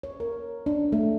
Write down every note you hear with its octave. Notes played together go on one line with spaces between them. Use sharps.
C#5
A#4
D4
A3